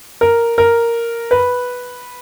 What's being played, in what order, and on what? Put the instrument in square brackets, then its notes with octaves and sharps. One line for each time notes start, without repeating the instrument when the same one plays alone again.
[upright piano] A#4
A#4
B4